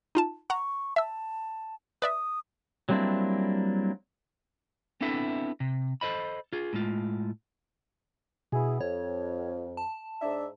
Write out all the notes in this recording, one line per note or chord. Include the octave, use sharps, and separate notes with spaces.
D#4 F4 A5
F#5 A#5 C#6
E5 A5 E6
B4 D5 E5 D#6
F#3 G3 A#3 C4 D4 E4
B3 C4 D4 E4 A4 E5
C3
A4 C5 D#5 B5
F4 G#4
A2 G#3 F4
B2 B3 E4 G#4
F2 C#5
A5
G#2 D4 E5